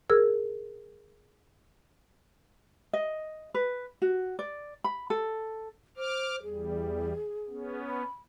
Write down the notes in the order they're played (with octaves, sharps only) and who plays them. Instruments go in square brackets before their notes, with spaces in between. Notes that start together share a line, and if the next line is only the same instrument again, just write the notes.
[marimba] G#4 A#4 E6 F6 G#6
[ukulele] D#5
B4
F#4
D5
B5
A4
[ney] C5 [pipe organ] D6 F6
[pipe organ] E2 G3 [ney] G#4
[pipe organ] B3 C#4
[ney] B5